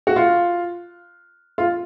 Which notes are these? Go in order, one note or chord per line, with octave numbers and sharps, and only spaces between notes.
F#4
F4
F4